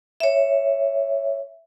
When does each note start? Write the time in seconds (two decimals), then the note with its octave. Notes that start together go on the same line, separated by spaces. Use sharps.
0.20 C#5 E5